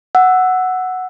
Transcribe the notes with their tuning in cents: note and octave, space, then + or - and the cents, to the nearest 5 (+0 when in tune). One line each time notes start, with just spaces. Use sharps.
F#5 +0 E6 +0